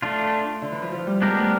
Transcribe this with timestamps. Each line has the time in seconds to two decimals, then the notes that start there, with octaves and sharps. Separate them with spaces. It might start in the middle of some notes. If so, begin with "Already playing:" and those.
0.02 A3 D4 F4
0.62 D3
0.72 E3
0.82 F3
0.92 F3
1.07 G3
1.22 G#3 B3 D4 G4 A#4
1.37 A3